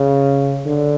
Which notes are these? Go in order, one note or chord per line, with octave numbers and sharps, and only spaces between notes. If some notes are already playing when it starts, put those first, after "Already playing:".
Already playing: C#3
D3